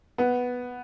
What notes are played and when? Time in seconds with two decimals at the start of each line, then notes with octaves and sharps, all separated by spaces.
0.18 B3